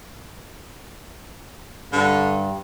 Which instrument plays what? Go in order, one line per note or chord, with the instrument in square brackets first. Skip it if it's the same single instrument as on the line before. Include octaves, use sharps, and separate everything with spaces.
[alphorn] G2 [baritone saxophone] D3